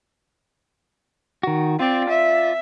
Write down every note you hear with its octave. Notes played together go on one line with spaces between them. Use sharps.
D#3 F#4
C4 F4 D5
E5